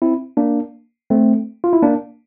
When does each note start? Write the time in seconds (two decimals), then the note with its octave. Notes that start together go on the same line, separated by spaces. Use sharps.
0.02 C4 E4
0.37 A#3 D4
1.10 A3 C4
1.64 F4
1.73 E4
1.82 A#3 D4